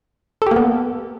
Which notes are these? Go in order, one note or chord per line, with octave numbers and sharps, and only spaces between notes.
A#3 B3 G4 A4